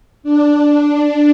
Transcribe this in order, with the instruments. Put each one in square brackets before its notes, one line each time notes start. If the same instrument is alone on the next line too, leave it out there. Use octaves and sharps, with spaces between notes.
[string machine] D4